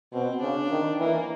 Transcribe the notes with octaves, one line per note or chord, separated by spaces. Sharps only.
B2 C4
C#3 D4
D#3
E3 A#3